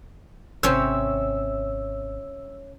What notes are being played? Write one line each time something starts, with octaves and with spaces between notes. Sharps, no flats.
G#1 C3 C4 C#4 C5 C#5 E5 E6